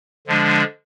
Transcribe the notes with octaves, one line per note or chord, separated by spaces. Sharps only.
D3 F3 G#3 D4